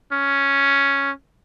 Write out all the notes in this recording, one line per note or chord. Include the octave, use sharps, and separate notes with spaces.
C#4